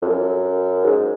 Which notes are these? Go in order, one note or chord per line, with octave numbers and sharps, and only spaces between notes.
F2
F#2
G#2